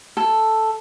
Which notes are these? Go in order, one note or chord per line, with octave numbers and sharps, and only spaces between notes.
A4